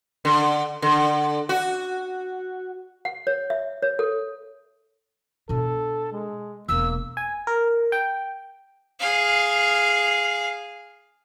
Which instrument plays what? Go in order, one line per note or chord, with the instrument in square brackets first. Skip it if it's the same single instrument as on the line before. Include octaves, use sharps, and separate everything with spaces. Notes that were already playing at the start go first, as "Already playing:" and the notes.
[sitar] D3
D3
F#4
[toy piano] F#5
C#5
E5
C#5
A4
[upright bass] B2 D4 [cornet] A4
[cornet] G#3
[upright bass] E1 [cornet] A#3 [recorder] E6
[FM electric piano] G#5
A#4
G5
[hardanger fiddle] G#4 F5